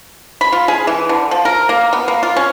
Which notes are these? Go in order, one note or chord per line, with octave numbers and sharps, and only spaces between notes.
B5
F4
G#4
E3
D3
F3
A#4
A#3
B3
A#3
F4
C#4